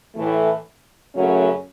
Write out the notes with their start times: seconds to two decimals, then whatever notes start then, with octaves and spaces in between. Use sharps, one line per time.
0.16 A2 E3 A3
1.15 F#2 C#3 F#3 A3 C#4